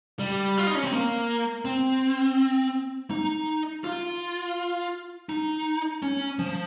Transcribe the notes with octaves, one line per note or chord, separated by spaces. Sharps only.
G3
F4
D#4
C#4
C4
A#3
C4
D#4
F4
D#4
C#4
F3